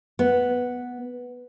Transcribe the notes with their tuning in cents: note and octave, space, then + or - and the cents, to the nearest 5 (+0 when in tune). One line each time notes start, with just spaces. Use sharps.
B3 -5